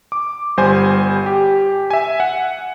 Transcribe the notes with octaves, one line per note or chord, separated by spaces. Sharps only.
D6
G1 G3 C5 G#5
G4
E5 G#5
F#5